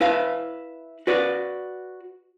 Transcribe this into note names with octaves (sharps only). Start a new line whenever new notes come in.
E4 B4 F5
F#4 B4 D5